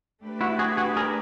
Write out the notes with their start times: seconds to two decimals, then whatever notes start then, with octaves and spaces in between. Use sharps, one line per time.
0.22 A3 D4 G4 B4
0.41 E4 F#4
0.59 F#4 G#4
0.77 F#4 G#4
0.97 G#4 A#4